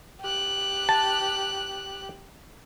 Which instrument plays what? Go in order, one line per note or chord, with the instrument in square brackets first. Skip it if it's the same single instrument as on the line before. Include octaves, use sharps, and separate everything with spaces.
[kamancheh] G4 F#6
[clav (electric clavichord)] A5